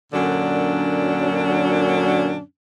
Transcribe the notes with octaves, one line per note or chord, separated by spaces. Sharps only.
F#2 A#2 D3 F#3 C#4 D4